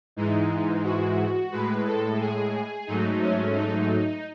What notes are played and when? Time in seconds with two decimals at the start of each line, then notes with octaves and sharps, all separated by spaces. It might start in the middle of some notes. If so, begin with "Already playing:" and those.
0.16 G#2 E3 G#3 D#4
0.84 F#4
1.52 A2 G#3 B4
1.86 A4
2.20 G#4
2.87 G#2 F#3 A3 D#4
3.21 C#4
3.55 D#4